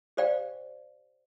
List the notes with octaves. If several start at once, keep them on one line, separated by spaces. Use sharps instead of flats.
G4 C5 D5 F5 G5